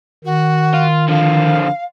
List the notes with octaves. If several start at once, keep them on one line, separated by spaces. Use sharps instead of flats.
D#3 F#4
F4
D3 F3 F5